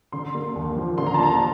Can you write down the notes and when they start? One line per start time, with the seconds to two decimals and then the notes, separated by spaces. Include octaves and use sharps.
0.12 D3 C6
0.35 A#3
0.56 D#2
0.76 F3
0.98 D3 C6
1.07 A#5
1.14 A5
1.19 A#3 A#5